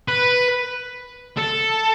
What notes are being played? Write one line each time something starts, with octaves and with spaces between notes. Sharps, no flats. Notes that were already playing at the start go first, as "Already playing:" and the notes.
B4
A4